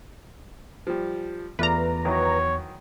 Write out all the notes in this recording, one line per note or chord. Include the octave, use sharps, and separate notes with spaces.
F3 G3
E2 A3 F4 B4 D5 A#5
D#3 E3 F#3 C#5